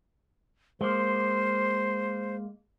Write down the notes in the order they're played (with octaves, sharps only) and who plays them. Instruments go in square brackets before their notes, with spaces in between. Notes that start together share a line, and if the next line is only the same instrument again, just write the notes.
[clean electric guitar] G#3 A#3 [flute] C5